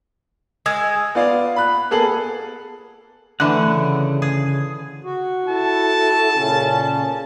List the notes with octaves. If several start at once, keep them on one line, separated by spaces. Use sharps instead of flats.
G#3 D#6 E6 G#6
B3 F4 D5 F5
B5 F#6
A#3 B3 G#4 A4 F#7
D3 E3 A3 F#5
C#3
G#4
F#4
E4 A4 A5
A#2 C#3 C#4